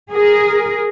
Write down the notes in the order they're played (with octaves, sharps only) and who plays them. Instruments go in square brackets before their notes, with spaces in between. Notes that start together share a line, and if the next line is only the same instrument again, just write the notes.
[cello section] G#4 A#4